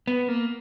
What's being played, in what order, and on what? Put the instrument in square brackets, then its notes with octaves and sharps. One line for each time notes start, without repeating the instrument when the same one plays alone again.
[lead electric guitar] B3
A#3